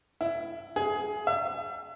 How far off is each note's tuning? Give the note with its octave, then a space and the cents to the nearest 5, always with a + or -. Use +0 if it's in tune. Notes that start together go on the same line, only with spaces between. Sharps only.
E4 +20
G#4 +20
E5 +35